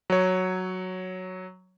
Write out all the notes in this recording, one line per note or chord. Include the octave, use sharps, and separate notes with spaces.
F#3 C#5